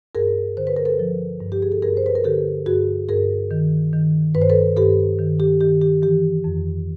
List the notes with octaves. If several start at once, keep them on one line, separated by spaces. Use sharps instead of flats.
G2 G#4 A#4
D3 C5
B4
A#4
A4 B4
F3
G2
G4
G#4
A4
G2 G#4 A#4
C5
B4
A#4
D3 G4 A4
G2 F#4 G#4
G2 G#4 A#4
D#3
D#3
G2 B4
C5
A4 B4
G2 G4 A4
D#3
G4
D#3 G4
G4
E3 G4
F2